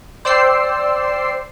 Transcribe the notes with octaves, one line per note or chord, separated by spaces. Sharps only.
C5 D5 G5 E6 C7